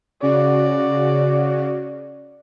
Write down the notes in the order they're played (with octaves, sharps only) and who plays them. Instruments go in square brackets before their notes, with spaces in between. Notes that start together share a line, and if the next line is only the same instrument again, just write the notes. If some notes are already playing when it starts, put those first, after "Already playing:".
[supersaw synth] C#3 F#4 [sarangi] D5